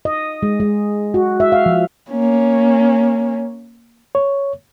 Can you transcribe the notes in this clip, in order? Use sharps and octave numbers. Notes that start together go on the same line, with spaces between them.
D#5
G#3
G#3
F#4
E5
F5
F3
A#3 C#4
C#5